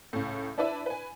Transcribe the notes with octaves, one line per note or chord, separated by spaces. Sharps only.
C#2 A2
D4 E4 B4 D5 E5
B4 G#5